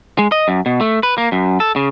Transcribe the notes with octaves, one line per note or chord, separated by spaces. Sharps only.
G#3
D#5
F#2
B2
A3
B4
A#3
F#2
A4
C#3